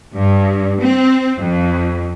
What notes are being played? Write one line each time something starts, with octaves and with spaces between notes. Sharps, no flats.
G2
C4
F2